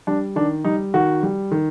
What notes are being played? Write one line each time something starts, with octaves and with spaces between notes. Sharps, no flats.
G3 D4
D#3 D4
G3 D#4
D#3 F#4
G3
D#3